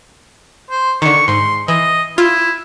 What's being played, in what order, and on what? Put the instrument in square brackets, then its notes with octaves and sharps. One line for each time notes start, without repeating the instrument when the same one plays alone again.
[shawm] C5
[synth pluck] D3 D#3 [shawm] C#6
[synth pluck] G#2 [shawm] C6
[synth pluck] E3 [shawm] D#5
[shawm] E4 [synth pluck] F4